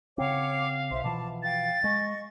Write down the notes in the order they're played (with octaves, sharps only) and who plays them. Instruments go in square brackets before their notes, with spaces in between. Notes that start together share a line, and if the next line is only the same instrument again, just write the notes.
[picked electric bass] C#3 C4 [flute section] C#5 F#5 D6 [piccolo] F5
[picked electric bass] B1 [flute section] C5 E5 C6
[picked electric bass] B2 E3 F3 [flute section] A5 D6
[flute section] F5 G5 [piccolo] A6
[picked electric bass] G#3 [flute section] D#5 C#6